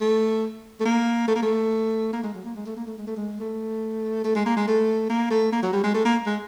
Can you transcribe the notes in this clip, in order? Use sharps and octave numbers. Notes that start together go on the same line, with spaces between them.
A3
A3
A#3
A3
A#3
A3
A#3
G#3
F#3
A#3
G#3
A3
A#3
A3
G#3
A3
G#3
A3
A3
G#3
A#3
G#3
A3
A#3
A3
A#3
F#3
G3
G#3
A3
A#3
G#3